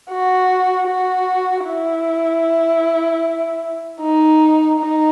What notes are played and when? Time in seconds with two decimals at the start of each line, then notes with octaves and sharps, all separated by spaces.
0.10 F#4
0.88 F#4
1.66 E4
4.01 D#4
4.80 D#4